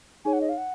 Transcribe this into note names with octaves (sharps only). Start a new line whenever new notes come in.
D#4 G#4 C#5 G#5
F#5
D#5
F5
F#5